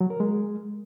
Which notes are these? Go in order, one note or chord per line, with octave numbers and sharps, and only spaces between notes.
F#3
A#4
G#3